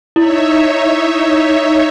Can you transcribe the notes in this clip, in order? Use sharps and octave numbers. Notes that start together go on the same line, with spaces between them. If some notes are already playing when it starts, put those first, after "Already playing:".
D#4 E4 C#5 E5